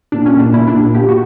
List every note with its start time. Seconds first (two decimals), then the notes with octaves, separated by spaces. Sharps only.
0.12 A#2 D4
0.26 C#4
0.33 A#2
0.40 D4
0.53 A#2 E4
0.67 D4
0.74 A#2
0.94 A#2 G4
1.09 F#4